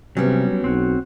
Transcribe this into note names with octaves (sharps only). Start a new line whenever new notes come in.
C3 F#3 G3 B3 C#4
B1 C4 F#4 C#5